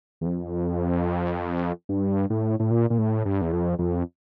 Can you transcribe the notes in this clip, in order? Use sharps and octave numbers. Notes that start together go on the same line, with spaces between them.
E2
F2
G2
A2
A2
A#2
A#2
A2
G2
E2
F2
F2